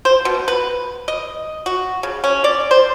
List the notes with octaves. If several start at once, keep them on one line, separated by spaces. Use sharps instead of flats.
C5
B2
B4
D#5
F#4
C#3
C#4
D5
C5